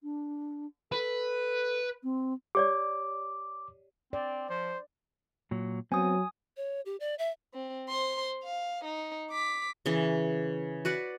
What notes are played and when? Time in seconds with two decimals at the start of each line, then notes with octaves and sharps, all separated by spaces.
0.03 D4
0.92 A4 B4
2.03 C4
2.55 G4 C#5 D5 D6
4.13 C4 D5
4.50 F3 C5
5.51 A#2 F#3
5.92 F#3 B3 C4 G#5 D#6
6.57 C#5
6.86 G4
7.00 D5
7.19 E5
7.54 C4
7.88 C5 C6
8.44 F5
8.85 D#4
9.31 D6 B6
9.86 C#3 E3
10.85 F#4 B4 D5 F#5